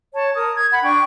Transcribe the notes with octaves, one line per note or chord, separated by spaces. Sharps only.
C#5 A5
A#4 D#6
G#6
F#5 B5
D4 G5 C#6